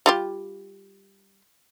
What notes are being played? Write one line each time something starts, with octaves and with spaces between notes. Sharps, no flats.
G3 F4 G4